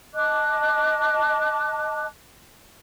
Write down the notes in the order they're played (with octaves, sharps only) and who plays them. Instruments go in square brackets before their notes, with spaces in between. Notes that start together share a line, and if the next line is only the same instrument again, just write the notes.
[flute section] D#5 A5 D6 F#6